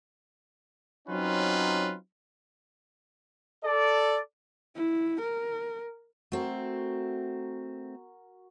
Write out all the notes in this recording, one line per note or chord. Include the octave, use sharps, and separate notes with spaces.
F#3 C4 C#4 D#4 F4 B4
A4 D5
E4
A#4
A3 C4 F#4 A#4